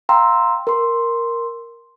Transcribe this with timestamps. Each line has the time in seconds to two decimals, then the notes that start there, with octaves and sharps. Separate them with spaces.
0.09 F5 G5 A#5 C6 E6
0.67 A#4 C6